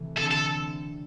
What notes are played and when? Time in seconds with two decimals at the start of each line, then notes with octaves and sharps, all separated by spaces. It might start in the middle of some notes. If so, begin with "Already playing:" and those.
Already playing: C3 E3 A3
0.16 D3 C4 E4 A4
0.31 A4